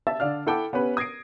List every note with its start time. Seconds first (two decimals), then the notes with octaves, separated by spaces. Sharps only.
0.07 E5 A5 E6 A6
0.20 D3 D4 F5 F6
0.47 E4 A4 F#5 G5 A5 D6
0.73 B3 C#4 G4 B4
0.97 D#6 G#6 A#6 C7 D7